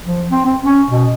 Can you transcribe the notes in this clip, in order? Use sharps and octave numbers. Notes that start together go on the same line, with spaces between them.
F3
C4
C4
C#4
B2